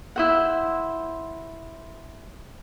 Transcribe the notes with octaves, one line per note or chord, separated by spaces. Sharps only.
E4 C5 F#5